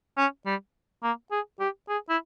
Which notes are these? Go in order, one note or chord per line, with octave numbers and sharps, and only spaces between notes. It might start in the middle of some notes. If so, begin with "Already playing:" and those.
C#4
G3
A#3
G#4
G4
G#4
E4